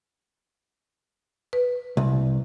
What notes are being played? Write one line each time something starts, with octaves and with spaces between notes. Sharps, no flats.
B4
C2